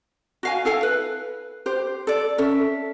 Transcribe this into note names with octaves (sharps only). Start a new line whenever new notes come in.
F#4 F5 G#5
E4 A4 F5 G#5
B4
G4 C5
A4 D5
C#4 A4 E5